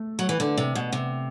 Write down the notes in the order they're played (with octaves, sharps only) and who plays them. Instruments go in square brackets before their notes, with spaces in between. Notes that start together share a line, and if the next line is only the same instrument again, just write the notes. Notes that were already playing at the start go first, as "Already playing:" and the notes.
Already playing: [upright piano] A3
[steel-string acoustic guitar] F#3
E3
D3
C3
B2
C3